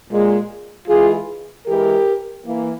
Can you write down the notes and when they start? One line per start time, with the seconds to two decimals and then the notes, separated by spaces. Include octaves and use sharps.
0.10 A#2 G#3
0.88 E3 G#3 F4 G#4
1.67 E3 G#3 G4 A#4
2.45 E3 A#3